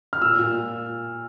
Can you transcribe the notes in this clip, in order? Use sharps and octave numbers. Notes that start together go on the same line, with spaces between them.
F6
A#2 E6
A#2